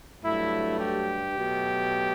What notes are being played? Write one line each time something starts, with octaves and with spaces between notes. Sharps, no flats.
G2 F#3 A3 E4
G4
B2 F#3 A3